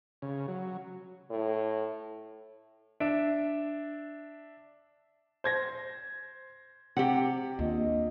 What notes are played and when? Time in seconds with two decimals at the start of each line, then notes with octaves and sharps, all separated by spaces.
0.22 C#3
0.48 F#3
1.30 A2
3.00 D4 E5 D7
5.44 C5 G#6 A#6
6.97 C3 G4 F#5
7.59 D#2 D4 F4 D#5